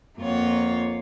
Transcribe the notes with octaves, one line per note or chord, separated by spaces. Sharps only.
F2 A#3 F4 C#5 F#5